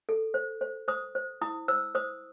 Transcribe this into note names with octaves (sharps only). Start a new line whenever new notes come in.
A4
C5
C5
C5 D#6
C5
E4 D#6
C5 E6
C5 D#6